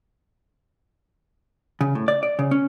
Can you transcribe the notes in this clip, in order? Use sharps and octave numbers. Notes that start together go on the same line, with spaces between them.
C#3
A2
D5
D5
C#3
C#4